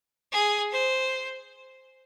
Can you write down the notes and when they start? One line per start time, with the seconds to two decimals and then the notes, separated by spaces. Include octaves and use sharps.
0.32 G#4
0.72 C5